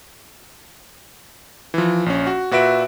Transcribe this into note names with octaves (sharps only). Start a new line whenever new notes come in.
E3 F3
A#1 C#4
F#4
A#2 F#4 B4 E5 D7